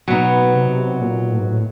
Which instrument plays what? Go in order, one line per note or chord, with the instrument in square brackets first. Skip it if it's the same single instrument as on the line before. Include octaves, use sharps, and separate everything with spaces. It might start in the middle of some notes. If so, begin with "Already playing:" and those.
[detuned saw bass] B2 [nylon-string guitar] F#3 B3 D#4
[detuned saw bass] C3
A#2
A2
G#2
A2